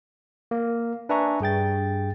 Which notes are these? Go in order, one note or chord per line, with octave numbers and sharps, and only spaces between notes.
A#3
D4 B4 E5 G#5 A#5 C#6
G2 G#4 G5 A6